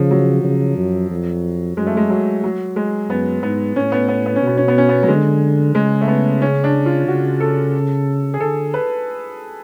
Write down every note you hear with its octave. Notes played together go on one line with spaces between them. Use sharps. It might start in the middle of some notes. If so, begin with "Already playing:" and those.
Already playing: C#3 F3
F#3
C#3
F#2
F2
F#2 G#3
A3
G#3
F#3
F#3
G#3
F#2 B3
G#2 B3
A2 C#4
B3
B3
B3
C#4
B2 B3
C#4
B3
C#4
B3
F#3
D3 G#3
C#3 G#3
A3
B3
C#4
D4
F4
C#3 F#4
A4
G#4
D3 A4
B4